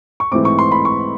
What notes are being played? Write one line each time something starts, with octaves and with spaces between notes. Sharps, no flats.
C#6
G#2 E3 A3 C4 D6
C#6
C6
B5
C#6